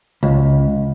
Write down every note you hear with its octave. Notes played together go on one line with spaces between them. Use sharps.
C#2